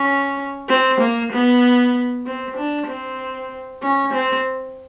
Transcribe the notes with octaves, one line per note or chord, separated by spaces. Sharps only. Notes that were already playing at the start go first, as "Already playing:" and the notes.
Already playing: C#4
C4
A#3
B3
C4
D4
C4
C#4
C4